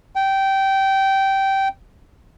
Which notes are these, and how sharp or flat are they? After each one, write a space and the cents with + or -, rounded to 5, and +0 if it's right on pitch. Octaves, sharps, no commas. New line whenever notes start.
G5 -15